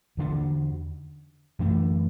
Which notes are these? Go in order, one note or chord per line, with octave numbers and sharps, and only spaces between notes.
E2 D3 A3 D4
F#2 E3 A3 D4